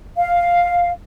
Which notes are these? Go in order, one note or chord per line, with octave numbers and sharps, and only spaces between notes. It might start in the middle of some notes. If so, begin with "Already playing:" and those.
F5